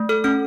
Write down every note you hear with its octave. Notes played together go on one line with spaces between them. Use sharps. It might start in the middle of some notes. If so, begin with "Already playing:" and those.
Already playing: A3
A4 F6
C#4 F6